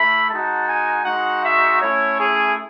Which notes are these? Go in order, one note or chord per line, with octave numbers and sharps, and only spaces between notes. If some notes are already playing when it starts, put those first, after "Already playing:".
Already playing: A3 E4 B5
G#3 D#4 F#4 A5
G#5
G#3 D#4 F#4 F#5
E5
A3 C#4 E4 C#5
G#4